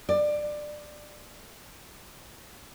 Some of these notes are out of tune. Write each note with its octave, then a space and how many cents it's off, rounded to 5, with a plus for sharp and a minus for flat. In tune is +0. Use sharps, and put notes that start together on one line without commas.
D5 +20